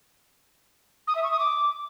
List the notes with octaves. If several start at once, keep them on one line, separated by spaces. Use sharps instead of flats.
D#6
E5
C#6
D#6
D6